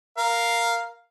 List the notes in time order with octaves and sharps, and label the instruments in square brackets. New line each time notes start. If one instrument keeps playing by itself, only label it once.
[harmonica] A#4 F5